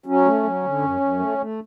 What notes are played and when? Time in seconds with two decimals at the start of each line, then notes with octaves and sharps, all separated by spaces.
0.06 F#3 C#4
0.25 A3
0.43 F#3
0.63 D3
0.82 F#2
1.00 F#2
1.19 A3
1.38 A3